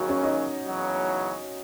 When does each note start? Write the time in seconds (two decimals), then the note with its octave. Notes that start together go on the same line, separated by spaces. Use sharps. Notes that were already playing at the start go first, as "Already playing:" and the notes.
Already playing: D#2 C#3 F#3 F#4
0.09 C#4
0.24 D#4
0.67 E2 C#3 F#3